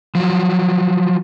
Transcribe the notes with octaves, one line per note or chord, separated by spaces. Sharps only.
F3 F#3